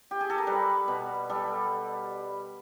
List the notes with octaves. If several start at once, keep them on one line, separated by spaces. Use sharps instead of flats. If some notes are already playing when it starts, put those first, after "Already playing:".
G4
G#4
A4
A#4
G3 B4
B2
G3 A4